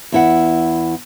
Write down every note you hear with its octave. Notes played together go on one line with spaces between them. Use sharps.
E2 E4 F#5